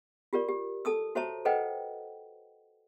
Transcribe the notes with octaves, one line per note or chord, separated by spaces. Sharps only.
F4 G4 A#4 D5
G4
A4 A5 D#6 E6
F#4 C5 C#5 E5 A5 A#5
A4 B4 C5 D#5 F#5 G5